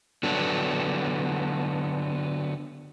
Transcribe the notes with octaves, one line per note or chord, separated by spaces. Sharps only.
D3 F#3 B3 D4